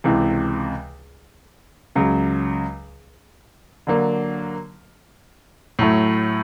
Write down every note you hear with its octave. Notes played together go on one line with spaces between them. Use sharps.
C#2 C3 E3
C#2 C#3 F#3
D3 F#3 A#3
A2 F#3 A3